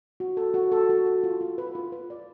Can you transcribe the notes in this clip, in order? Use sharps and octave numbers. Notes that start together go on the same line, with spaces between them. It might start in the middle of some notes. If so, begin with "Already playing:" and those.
F#4
A4
F#4
A4
F#4
A4
F4
F4
B4
F4
B4
D5